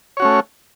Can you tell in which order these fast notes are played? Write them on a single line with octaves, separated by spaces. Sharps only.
C#5 F#4 C#4 A3